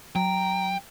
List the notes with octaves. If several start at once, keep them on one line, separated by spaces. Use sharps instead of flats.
F#3 G5 A#5